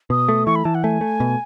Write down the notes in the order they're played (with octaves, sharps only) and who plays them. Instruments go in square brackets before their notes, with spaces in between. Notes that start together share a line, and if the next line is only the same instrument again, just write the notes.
[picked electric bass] B2 [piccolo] D#6
[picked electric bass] A3
[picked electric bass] E3 [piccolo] C#6
[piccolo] B5
[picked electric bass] E3 [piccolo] A5
[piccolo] F#5
[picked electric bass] A3 [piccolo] G#5
[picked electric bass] A3
B2